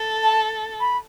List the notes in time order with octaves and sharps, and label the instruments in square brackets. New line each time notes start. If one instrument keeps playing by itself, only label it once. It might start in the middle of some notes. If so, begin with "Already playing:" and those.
Already playing: [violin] A4
[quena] A5
B5